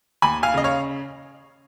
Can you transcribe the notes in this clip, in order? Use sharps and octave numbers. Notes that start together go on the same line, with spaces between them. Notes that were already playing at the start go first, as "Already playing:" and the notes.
D#2 G#5 B5
F5 G#5
C#3 D#5
C#5 F5